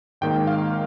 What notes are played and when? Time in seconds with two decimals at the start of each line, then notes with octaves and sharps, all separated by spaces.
0.21 G#1 G#2 D#3 A#3 G5
0.47 F5